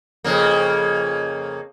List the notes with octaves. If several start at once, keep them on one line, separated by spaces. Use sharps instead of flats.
F2 C#3 A#3